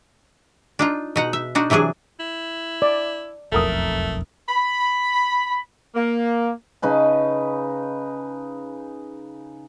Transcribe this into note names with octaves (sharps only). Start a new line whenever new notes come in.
D4 D#4 F4
B2 D#4 F#5
E5
D4 D#4 F#4
C3 E3 F#3 D4 G#4
E4
D5
E1 B1 F2 A3 A4 A#4 D#6
B5
A#3
C#3 D#4 B4 A5